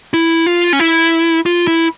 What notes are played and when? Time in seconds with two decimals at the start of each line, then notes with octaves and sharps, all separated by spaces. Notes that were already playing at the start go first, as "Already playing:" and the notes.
0.14 E4
0.47 F4
0.73 C#4
0.80 E4
1.46 F4
1.67 E4